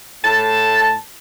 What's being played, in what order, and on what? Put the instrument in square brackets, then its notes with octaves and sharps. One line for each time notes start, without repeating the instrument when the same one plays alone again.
[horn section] A2 A5